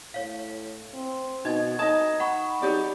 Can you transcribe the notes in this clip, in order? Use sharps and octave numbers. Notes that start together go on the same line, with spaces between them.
A2 C#5 F5
C4
B2 D#4 D#5 G#6
D#4 D#5 A5 D#6 G#6
F#5 B5 C#6
F#3 D#4 G4 D5